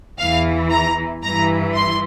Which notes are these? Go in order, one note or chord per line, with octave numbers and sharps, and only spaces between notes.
E2 E3 F5
A#5
G2 E3 A#5
C6